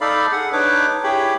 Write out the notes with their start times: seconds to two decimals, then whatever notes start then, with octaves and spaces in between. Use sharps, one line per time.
0.01 D#4 A4 D5 F5 B5
0.32 G#4 F#5
0.53 D4 D#4 B4 C#5 D6
1.04 E4 G4 G#4 C#5 G5 B5